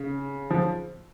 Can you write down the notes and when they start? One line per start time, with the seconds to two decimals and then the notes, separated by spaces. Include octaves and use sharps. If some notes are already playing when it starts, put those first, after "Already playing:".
Already playing: C#3
0.50 F3